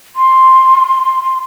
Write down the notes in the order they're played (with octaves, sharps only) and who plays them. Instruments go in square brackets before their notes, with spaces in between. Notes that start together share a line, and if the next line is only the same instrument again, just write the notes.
[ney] C6